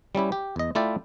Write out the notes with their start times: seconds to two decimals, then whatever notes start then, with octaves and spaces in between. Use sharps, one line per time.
0.15 G3 C#4 E4 G4
0.32 G4
0.56 E2 D#5
0.75 A3 E4 F4 D5 E5 G5